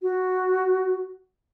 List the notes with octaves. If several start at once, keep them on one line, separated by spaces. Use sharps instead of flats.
F#4